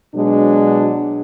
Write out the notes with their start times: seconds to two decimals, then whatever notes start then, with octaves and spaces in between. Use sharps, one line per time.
0.15 B2 F#3 G#3 D4